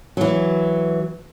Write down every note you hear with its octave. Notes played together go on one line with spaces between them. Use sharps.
E3 F#3